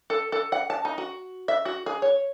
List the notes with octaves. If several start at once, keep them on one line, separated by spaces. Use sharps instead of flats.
A4
A4
F#5
A5
D#4
F#4
E5
F#4
G#4
C#5